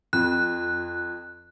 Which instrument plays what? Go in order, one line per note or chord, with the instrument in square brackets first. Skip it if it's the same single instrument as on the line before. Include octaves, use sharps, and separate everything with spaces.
[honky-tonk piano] F2 [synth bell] F#6